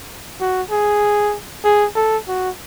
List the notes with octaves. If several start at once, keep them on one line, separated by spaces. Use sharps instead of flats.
F#4
G#4
G#4
A4
F#4